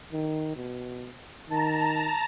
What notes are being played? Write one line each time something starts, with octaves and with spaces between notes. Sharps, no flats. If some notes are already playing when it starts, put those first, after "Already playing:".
D#3
B2
D#3 A5 A#5